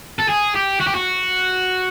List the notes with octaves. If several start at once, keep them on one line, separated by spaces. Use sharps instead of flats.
A4
G#4
G4
F#4
G4
F#4